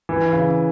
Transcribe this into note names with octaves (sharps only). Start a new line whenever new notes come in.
E3
C#3